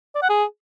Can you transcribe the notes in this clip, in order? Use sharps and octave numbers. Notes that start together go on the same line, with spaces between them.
D5
F#5
G#4